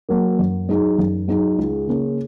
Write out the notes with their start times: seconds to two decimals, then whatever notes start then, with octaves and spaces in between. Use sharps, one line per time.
0.09 F#3 A#3
0.39 F#2
0.69 F#3 D#4 G#4
0.98 F#2
1.28 F#3 D#4 G#4
1.58 C#2
1.87 C#3 A#3 C#4